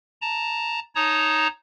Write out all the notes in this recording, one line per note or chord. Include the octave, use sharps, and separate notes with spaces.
A5 A#5
D#4 C#5 A5 A#5 D#6